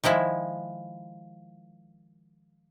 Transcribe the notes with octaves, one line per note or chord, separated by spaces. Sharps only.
D#3 F3 G#3 E4